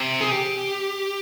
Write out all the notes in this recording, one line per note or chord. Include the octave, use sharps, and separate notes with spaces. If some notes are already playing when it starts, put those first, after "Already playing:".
Already playing: C3
G#4
G4